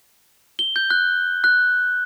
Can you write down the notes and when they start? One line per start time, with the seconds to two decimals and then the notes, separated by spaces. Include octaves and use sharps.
0.59 G7
0.76 G6
0.90 F#6
1.44 F#6